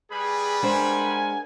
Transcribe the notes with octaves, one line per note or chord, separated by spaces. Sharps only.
G3 G#4 B4 B5
G#3 D4 A#4 C5 F#5 G#5